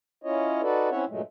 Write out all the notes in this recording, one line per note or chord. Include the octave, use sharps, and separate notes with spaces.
C#4 E4 F4 C#5 D#5
D#4 F#4 A4 B4 D5
C4 C#4 E4 C#5 E5 F#5
G2 A#2 F#3 G#3 A3